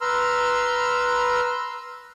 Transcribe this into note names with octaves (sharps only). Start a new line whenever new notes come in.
B4 A#5 C6 E6 F6